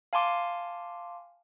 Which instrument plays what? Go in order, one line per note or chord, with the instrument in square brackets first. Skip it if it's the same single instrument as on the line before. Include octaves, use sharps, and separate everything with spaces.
[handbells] F5 G#5 A5 C6 D6